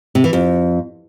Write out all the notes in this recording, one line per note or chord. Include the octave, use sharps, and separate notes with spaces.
C3
E3
F2